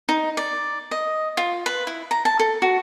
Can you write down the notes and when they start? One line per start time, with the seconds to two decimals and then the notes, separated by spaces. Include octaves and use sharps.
0.09 D#4
0.37 D5
0.91 D#5
1.37 F4
1.66 B4
1.87 E4
2.11 A#5
2.25 A5
2.39 A4
2.62 F#4